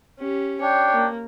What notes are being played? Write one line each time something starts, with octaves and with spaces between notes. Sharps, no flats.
C#4 G4
D4 C#5 G5
A#3